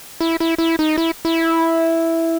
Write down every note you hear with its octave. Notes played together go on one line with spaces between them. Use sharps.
E4
E4
E4
D#4
E4
E4